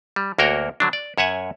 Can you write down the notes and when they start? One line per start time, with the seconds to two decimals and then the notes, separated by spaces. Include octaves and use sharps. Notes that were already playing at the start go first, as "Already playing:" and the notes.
0.16 G3
0.38 D2 A#3 F#4 A#4 C#5 G5
0.80 D3 F#3 D4
0.93 D5
1.18 F#2 C#5 E5 F#5 G#5